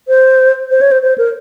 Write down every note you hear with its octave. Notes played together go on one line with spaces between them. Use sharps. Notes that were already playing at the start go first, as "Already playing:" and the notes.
C5
C5
C#5
C5
C5
A#4